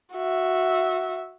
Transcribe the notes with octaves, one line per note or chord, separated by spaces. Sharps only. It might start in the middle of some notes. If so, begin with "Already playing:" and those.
F#4 E5